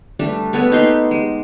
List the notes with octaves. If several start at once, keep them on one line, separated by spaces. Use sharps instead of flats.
G3 A3 D4
B3 A4 B4 C#5
B3 D#4 G4 C6
G#3